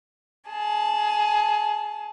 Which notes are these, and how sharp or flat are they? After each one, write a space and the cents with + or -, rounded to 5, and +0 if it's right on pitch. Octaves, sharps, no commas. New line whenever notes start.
G#4 +15 A5 -5